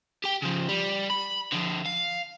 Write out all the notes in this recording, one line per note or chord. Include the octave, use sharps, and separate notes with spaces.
G4 G5
C#3 F3
G3
B5
D3 F3
F5